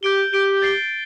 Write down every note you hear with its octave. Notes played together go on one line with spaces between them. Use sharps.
G4 G6 D7 G7
G4 G6 D7 G7
A6 C7 G7